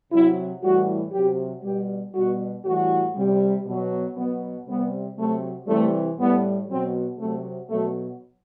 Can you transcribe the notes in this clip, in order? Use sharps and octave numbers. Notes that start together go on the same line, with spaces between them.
C3 F#3 E4
A2 E3 G3 F#4
C3 F#3 G4
B2 G3 G4
B2 G3 F#4
A2 E3 G3 F#4
C3 G3
B2 F#3
B2 F#3 B3
C3 G3 B3
C3 F#3 A3
C3 E3 G3 A3
A2 G3 B3
B2 F#3 C4
C3 F#3 A3
B2 F#3 A3